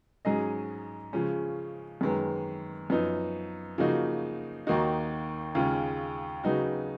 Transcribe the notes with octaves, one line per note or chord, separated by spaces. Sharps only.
G#2 F#3 C#4 G#4 D#5
C#3 F3 G#3 C#4
F#2 D#3 G#3 B3
F#2 F3 B3 D#4
C#3 F3 A#3 D#4 F#4
D#2 D#3 A#3 D#4 F#4
D#2 C#3 G#3 C#4 F4
C#3 F#3 B3 D#4 F#4